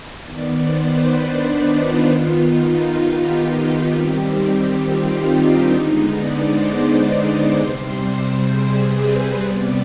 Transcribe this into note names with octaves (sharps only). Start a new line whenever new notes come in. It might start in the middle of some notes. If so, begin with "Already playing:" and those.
D#3 B3 D5
C5
B4
D4
D#4
F4
D#3 B3 F4
D#4
F4
G4
D#3 G3 C4
F4
D#4
D4
D3 G#3 B3 D#4
D5
C5
C5
C3 G3 C4
G#4
B4
C3 G3 B3 D5